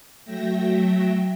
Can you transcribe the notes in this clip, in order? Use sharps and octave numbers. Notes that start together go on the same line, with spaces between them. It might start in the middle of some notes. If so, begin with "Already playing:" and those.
F#3 A3 E5 G5 A#6